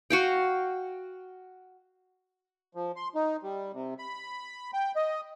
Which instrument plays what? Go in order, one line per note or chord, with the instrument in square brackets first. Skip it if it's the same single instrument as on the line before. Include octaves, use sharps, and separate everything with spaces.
[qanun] F#4 F5 G5
[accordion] F3
C6
D#4
G3
C3
B5
G5
D#5